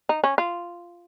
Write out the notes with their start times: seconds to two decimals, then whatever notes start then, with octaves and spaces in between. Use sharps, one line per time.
0.09 D#4
0.24 C#4
0.38 F4